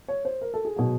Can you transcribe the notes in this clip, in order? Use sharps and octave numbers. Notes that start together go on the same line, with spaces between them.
C#5
C5
A#4
A4
G#4
B2 F#3